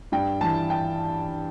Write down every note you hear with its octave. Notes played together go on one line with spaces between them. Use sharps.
G2 G5
E3 A5
G5